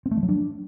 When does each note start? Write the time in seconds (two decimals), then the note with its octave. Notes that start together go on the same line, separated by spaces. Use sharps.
0.06 C4
0.11 A3
0.17 F3
0.23 F#3
0.29 D4